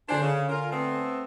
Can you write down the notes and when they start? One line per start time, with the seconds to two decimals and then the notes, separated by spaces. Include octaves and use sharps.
0.09 D3 D4 C5 G#5 E7
0.22 C#3
0.49 F4 A#4
0.71 A3 B3 C4